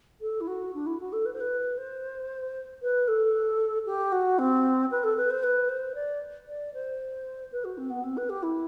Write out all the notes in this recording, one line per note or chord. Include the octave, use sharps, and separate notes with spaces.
A4
E4
F#4
D4
E4
F#4
A4
B4
C5
B4
C5
B4
A4
G4
F#4
C4
B4
A4
B4
C5
B4
C5
D5
D5
C5
B4
F#4
C4
B3
C4
B4
G4
E4